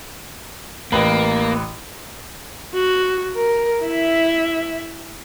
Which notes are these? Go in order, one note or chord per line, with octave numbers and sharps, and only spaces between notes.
A1 A#3 B4 F#7
F#4
A#4
E4 E5